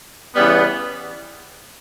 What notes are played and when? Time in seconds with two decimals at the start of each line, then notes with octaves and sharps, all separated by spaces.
0.34 C#3 E3 G3 B3